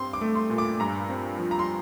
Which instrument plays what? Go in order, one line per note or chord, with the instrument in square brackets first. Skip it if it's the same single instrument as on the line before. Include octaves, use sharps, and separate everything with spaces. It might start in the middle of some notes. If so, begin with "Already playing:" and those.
Already playing: [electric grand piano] G2 C4 [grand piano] C6
[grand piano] D6
[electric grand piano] A3
[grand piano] C6
[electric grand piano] A#2
[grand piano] D6
[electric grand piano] G2 [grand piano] A#5
[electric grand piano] C4
F3
[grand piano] A#5
C6